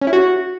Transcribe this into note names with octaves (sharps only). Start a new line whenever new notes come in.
C#4
E4
F#4